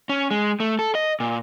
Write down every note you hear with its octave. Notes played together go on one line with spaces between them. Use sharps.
C#4
G#3
A3
A4
D#5
A#2